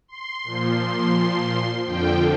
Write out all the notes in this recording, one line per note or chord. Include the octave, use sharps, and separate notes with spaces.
C6
A#2 F3
F2 D3 F3 G5